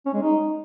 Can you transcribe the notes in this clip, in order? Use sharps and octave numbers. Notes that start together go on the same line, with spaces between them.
C#4
G#3
D#4